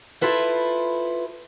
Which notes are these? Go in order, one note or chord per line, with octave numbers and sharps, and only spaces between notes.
E4 F4 A4 B4 C5